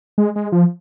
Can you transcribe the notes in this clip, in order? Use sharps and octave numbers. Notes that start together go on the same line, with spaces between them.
G#3
G#3
F3